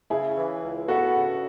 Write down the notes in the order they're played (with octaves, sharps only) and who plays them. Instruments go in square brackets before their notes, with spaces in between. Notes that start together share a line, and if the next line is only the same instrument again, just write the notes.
[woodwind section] C#3 [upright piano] E4 G#4
[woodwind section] E3
C#2
[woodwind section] B3 [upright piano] F#4 A4
[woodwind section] C#3